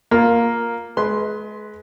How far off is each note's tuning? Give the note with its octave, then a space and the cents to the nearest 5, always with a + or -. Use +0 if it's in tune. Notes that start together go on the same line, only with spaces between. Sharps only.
A#3 +0 F4 +10
G#3 +30 B4 +0 C6 +0